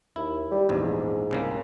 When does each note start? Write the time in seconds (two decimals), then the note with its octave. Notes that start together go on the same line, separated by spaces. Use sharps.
0.16 D#2 E4
0.51 G3
0.69 A#1 E2 G#2
1.31 C2 C#3 A#3